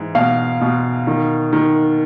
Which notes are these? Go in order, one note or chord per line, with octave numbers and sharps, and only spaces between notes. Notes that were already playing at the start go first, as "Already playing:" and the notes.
Already playing: G#2 E3
B2 F5
B2
D#3
D#3